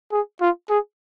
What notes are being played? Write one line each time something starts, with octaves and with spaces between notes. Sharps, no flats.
G#4
F4
G#4